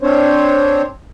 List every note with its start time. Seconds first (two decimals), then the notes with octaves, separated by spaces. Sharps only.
0.02 C4 D4 C5 C#5